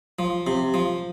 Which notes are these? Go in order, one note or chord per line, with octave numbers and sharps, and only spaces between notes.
F3
C3
F3